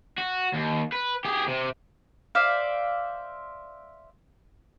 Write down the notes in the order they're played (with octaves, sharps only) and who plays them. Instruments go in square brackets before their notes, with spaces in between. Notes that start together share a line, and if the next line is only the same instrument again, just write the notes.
[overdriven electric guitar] F#4
D#2
B4
G4 G#4
C3
[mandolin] C5 D5 E5 F5